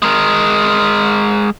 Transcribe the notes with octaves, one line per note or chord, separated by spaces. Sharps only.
G#3 A#4